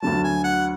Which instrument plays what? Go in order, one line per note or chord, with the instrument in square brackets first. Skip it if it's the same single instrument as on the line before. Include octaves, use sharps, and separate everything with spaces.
[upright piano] D2 D3 F#3 [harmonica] A5
[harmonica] G#5
F#5